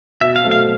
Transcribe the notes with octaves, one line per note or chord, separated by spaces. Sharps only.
B2 E5
F5
F#3 A3 C4
F5